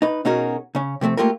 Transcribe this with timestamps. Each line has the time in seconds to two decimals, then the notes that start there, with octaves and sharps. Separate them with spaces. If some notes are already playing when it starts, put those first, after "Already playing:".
0.02 D#4 B4
0.25 B2 C#4 D#4 F#4 G#4 A#4
0.75 C#3 C#4
1.01 C3 F3 A3 C4
1.17 A3 A#3 F4 G4 A4 A#4